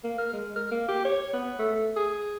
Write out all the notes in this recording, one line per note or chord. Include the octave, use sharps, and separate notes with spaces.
A#3
A#4
G#3
A#4
A#3
G4
C#5
B3
A3
G#4